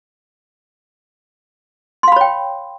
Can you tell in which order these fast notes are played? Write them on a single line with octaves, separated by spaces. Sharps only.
C6 F5 B5 C#5 G5